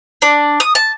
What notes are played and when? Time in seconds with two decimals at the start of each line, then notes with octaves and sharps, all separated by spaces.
0.22 D4
0.60 D#6
0.75 A5